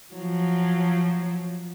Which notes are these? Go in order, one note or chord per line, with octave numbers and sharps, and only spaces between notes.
F3 F#3